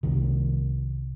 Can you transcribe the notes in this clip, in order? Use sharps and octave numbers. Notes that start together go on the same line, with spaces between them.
C2 C3 D#3